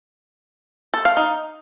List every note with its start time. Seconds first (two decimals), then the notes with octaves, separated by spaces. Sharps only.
0.94 A4
1.05 F5
1.17 D#4